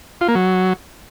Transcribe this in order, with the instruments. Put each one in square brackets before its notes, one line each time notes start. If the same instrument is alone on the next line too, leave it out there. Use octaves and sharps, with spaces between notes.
[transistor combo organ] F4
A#3
F#3